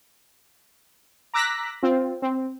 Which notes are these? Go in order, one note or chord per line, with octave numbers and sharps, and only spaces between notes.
A#5 D6 E6 F#6 A#6 B6
C4 F4
C4